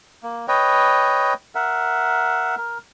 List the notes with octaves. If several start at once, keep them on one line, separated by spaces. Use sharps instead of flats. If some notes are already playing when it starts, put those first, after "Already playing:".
A#3
B4 C#5 D#5 G5
A#4 E5 F#5
A#4